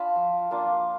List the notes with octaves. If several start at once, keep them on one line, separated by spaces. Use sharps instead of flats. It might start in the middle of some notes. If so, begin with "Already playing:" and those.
Already playing: D4 F4 A5 B5
F3
A#3 D4 F4